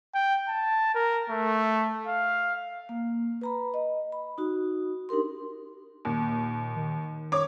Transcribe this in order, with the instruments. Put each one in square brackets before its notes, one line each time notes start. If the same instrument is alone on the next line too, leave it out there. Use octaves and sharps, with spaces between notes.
[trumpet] G5
A5
A#4
A3
F5
[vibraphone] A#3
B4 A#5 B5
D#5
B5
D#4 F#4
D4 D#4 G4 A#4 C6
[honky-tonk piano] D#2 [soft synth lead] A#2
[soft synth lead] D#3
[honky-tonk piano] C#5 D6